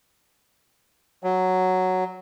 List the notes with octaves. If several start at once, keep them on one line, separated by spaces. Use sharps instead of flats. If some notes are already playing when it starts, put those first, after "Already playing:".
F#3